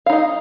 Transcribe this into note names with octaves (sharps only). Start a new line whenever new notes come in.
D#4 D#5 F5